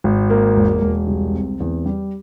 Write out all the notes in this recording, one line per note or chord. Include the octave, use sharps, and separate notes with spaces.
G#1
A#3
E1
E1
C2
C4
E2
G3